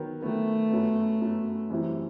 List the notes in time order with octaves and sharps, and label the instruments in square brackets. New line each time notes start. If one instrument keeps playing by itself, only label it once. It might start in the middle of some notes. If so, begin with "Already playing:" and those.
Already playing: [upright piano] D#3 F#3 B3
[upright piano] D#3 F#3 B3 [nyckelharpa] A3
[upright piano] F#2 F#3 B3
F#2 F#3 B3
F#2 E3 G3 C4 E4